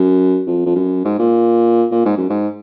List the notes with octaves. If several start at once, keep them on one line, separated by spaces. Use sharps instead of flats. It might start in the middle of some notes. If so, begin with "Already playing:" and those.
Already playing: F#2
F2
F2
F#2
G#2
A#2
A#2
G#2
F#2
G#2